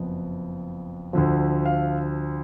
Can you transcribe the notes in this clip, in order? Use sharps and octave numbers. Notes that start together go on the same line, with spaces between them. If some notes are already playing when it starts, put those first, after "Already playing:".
Already playing: F#1 F2 F3 B3
D2 D3 F3
F5